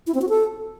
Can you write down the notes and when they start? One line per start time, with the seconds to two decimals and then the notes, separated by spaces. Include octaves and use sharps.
0.07 E4
0.14 C4
0.22 F#4
0.29 A4